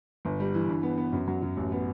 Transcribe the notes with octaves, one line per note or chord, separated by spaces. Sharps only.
G1
G3
E3
G2
B3
B3
F#2
F#3
F#2
A1
B3